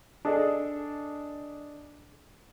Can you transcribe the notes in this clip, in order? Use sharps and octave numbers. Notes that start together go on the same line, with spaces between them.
D4 G#4 A4 D#5